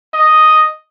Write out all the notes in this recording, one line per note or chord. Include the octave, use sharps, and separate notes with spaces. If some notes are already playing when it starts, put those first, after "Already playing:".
D#5